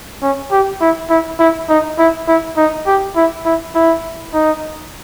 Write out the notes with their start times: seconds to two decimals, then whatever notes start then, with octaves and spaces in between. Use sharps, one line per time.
0.22 C#4
0.52 G4
0.81 E4
1.10 E4
1.39 E4
1.69 D#4
1.99 E4
2.28 E4
2.57 D#4
2.87 G4
3.16 E4
3.45 E4
3.75 E4
4.34 D#4